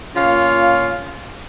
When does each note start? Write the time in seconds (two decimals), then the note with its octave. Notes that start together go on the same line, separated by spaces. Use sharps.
0.15 A#2 C#4 F4 F5